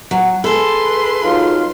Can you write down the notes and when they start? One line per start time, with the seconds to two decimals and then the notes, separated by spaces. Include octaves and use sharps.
0.11 F#3
0.44 G#4 A4 B4 C6
1.23 F#3 D#4 F4